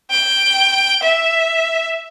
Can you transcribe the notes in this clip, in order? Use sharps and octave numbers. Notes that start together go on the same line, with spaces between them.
G5
E5